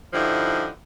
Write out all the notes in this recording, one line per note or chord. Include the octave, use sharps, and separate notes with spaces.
G2 D3 F3 D#4 E4